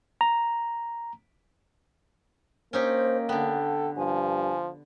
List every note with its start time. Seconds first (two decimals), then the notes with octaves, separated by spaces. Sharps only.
0.21 A#5
2.73 A#3 C#4 D#4 G4 C5
3.29 D3 B3 A4 G5
3.97 G2 F3 G#5